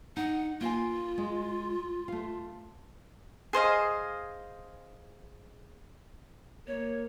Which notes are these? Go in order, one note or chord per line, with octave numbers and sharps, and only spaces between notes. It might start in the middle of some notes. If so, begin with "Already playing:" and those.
D#4 F#5
A#3 F4 F5 G#5
G#3
A3 F5
G#4 C5 D#5 F5
A#3 C#5